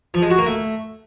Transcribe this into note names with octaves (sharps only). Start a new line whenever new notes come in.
F3
G#3
F#4
A#3
A3